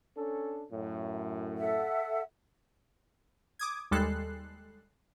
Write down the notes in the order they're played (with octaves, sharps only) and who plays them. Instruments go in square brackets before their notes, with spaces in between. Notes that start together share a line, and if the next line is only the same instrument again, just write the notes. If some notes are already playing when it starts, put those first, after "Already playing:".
[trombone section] C#4 D4 A4
F#2 A2
[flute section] A4 E5 F#5
[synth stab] D6 D#6 G#6
D#2 G3 G#3 A4 F#6 C7